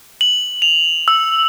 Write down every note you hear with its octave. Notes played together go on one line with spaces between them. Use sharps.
F#7
F7
E6